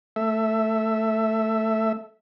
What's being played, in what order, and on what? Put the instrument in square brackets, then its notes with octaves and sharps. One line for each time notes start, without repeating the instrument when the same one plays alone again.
[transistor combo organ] A3 E5